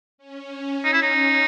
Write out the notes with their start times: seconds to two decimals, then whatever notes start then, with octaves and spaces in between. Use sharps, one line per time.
0.18 C#4
0.84 D#4
0.93 E4
1.02 D#4